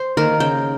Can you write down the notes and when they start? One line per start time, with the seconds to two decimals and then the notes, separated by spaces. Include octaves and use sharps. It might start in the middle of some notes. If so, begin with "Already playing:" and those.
Already playing: C5
0.17 D#3 A#3 A#4
0.40 C#3 G5